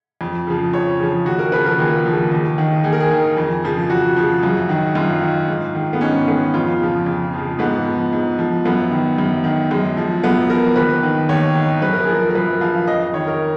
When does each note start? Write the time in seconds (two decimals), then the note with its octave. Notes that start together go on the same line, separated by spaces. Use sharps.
0.21 F2
0.47 C#3 F3
0.73 F2 C#5
0.99 C#3 F3 G#4
1.26 D#2 F#4
1.39 A#4
1.52 C#3 F3 B4
1.65 A#4
1.79 D#2 G#4
2.05 C#3 F3
2.32 D#2
2.58 D#3
2.84 D#2 G#4
2.93 A#4
3.00 G#4
3.11 D#3
3.37 F2
3.64 C#3 F3
3.90 F2 F#4
4.16 C#3 F3
4.43 F#2
4.69 D#3
4.95 F#2 F4
5.21 D#3
5.48 G#2
5.75 D#3
5.93 B3
6.01 G#2 C#4
6.27 D#3 B3
6.54 F2 F4
6.80 C#3 F3
7.06 F2
7.33 C#3 F3
7.59 G#2 B3
7.86 F3
8.13 G#2
8.39 F3
8.65 F#2 B3
8.91 D#3
9.18 F#2
9.44 D#3
9.71 F#2 G#3
9.97 F3
10.24 F#2 B3
10.50 F3 A#4
10.76 D#2 B4
11.03 D#3
11.29 D#2 C#5
11.55 D#3
11.81 F#2 B4
11.93 A#4
12.04 F3 G#4
12.14 A#4
12.30 A#4
12.35 F#2 B4
12.61 F3 F5
12.87 F2 D#5
13.00 D#5
13.14 D#3 C#5
13.27 A#4